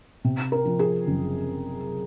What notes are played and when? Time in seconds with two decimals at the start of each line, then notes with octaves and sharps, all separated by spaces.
0.25 C3
0.52 A#4
0.65 F3
0.79 G#4
1.07 F#1